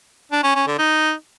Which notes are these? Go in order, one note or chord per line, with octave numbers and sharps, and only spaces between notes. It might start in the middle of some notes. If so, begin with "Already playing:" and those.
D4
C#4
C#4
D3
D#4